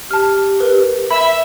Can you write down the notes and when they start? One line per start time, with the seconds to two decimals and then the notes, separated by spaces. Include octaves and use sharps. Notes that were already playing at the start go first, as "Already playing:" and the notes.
0.11 G4 A5 F6
0.60 A#4 B4
1.11 E5 B5